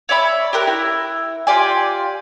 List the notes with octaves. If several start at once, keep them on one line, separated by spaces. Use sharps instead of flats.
C#5 D5 E5 B5
G4 A#4 F#6
E4
F4 G4 D5 G#5